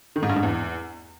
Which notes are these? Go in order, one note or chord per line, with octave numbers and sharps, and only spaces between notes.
D#3
G#2
G2
G#2
E2